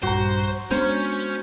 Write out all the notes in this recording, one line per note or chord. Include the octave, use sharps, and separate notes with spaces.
A#1 G2 F#4 C5 A#5
G#3 B3 C#4 D4 C5